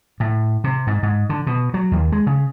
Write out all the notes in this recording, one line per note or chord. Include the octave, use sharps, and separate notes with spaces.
A2
C3
G#2
G#2
D3
B2
F#3
D#2
G#3
C#3